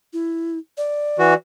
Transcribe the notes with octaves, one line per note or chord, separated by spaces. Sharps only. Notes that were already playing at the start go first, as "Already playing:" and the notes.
E4
D5
E3 F#4